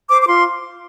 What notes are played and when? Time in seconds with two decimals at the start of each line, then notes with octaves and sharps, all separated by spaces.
0.09 C5 D6
0.20 D6
0.26 F4 C6